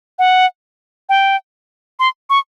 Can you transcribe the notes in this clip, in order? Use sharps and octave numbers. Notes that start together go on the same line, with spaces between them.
F#5
G5
C6
C#6